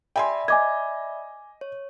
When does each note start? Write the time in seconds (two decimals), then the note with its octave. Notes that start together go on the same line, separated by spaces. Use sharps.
0.16 D5 E5 G5 G#5 B5 C6
0.48 D#5 G#5 D6 G#6
1.61 C#5